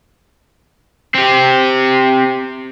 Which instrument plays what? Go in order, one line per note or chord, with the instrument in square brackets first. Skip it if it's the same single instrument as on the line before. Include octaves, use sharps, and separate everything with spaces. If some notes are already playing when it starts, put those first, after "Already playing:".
[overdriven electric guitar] C4 G4